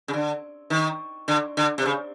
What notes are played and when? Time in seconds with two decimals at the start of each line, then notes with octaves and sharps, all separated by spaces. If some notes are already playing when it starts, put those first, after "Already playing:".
0.08 C#3
0.13 D3
0.70 D#3
1.28 D3
1.57 D3
1.78 C3
1.86 C#3